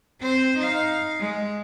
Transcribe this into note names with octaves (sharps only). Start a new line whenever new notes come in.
C4 C5
D#4 F5
G#3